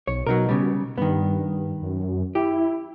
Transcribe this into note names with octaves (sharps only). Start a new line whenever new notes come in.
B1 C#5
B2 F#3 D#4 A#4
C#3 G3
G2 D#3 B3
F#2
E4 G4